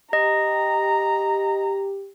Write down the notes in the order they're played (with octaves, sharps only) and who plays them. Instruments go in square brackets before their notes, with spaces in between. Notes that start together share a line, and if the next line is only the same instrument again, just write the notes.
[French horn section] G4 [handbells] D#5 [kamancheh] A#5